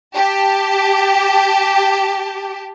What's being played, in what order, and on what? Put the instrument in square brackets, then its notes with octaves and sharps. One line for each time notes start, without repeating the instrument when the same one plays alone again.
[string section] G4 A5